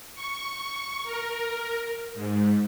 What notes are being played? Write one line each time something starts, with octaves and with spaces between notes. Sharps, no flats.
C#6
A#4
G#2